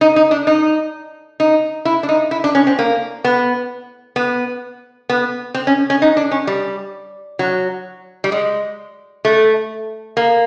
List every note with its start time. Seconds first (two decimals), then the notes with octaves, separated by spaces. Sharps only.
0.01 D#4
0.16 D#4
0.31 D4
0.47 D#4
1.40 D#4
1.85 E4
2.03 D4
2.09 D#4
2.31 E4
2.44 D4
2.55 C#4
2.67 C4
2.79 A#3
3.24 B3
4.16 B3
5.09 B3
5.54 C4
5.67 C#4
5.90 C#4
6.02 D#4
6.17 D4
6.31 C#4
6.47 G3
7.39 F#3
8.24 G3
8.32 G#3
9.25 A3
10.17 A#3